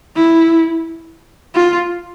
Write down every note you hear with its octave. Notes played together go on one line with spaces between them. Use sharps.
E4
F4